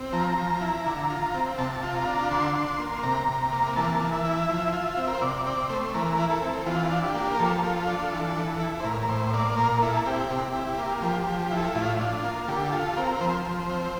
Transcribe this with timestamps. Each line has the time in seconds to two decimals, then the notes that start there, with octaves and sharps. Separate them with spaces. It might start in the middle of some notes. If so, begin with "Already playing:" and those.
Already playing: C4
0.13 F3 A#5
0.38 F3
0.61 E4
0.86 D3
1.10 F4
1.34 C4
1.58 C3 A5
1.83 F4
1.95 A#5
2.07 D4
2.31 D3 C6
2.55 D4
2.67 C6
2.80 A#3
3.03 C3 A#5
3.28 C3
3.52 A#3
3.76 E3 A5
4.00 E3
4.13 E5
4.25 E4
4.49 F3
4.73 F4
4.97 C4
5.08 A#4
5.15 C5
5.22 C3 D5
5.46 C4 D5
5.70 A3 C5
5.94 E3 A#4
6.19 E4
6.30 A4
6.42 C4
6.66 E3 F4
6.91 D4
7.04 G4
7.15 A#3
7.35 A#4
7.39 F3 A4
7.64 F4
7.88 D4
8.12 E3
8.36 E3
8.60 E4
8.80 C5
8.84 A2 A#4
9.02 A#4
9.09 A2 C5
9.33 A#3 D5
9.57 A#2 A#4
9.82 E4 A4
10.06 C4 G4
10.30 C3
10.54 E4
10.78 A#3
11.02 F3 G4
11.21 G4
11.27 F3
11.39 G4
11.51 E4
11.57 A4
11.75 A2 F4
11.99 D4
12.24 A#3
12.48 D3 G4
12.72 F4 A4
12.96 C4 A#4
13.15 A#4
13.21 F3 C5
13.45 F3
13.70 C4